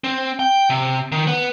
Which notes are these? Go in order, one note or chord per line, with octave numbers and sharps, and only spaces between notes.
C4
G5
C3
D#3
B3